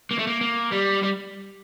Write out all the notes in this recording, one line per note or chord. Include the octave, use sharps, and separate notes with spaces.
A#3
A3
A#3
A#3
G3
G3